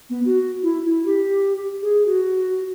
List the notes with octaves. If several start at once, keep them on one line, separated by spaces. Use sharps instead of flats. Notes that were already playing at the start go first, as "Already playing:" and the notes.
B3
F#4
E4
E4
G4
G#4
F#4